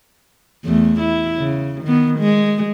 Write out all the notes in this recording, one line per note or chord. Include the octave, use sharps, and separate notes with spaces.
E2 A3
E4
C#3
D#3 B3
G#3